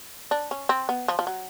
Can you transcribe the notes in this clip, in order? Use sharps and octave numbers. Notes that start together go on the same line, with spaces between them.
D4
C#4
C4
B3
F3
F3
F#3